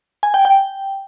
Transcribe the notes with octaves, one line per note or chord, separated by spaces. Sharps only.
G#5
G5
G5